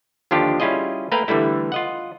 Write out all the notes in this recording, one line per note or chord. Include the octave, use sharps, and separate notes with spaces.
D#2 D3 F3 D4 F4 G4
G3 C#4 E4 F4 G#4 D#5
A3 A#3 A#4 B4 F5 G5
D3 E3 G3 A3 E4
F4 D#5 F#5